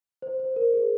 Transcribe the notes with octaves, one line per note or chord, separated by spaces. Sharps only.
C5
C5
A#4
G#4